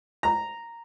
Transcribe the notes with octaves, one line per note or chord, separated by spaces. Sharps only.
A#5